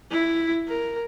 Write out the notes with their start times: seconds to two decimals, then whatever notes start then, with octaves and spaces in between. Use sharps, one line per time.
0.11 E4
0.68 A#4